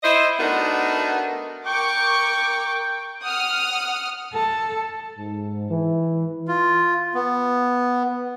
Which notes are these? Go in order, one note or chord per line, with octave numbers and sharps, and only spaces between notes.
E4 C5 D#5
A3 B3 D4 D#4 F#4 A#4
A#4 G5 C#6 D6
F#5 D#6 F6
A4
G#2
E3
F4
B3